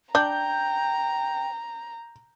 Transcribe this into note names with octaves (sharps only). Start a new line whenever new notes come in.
D4 G5 A#5 G6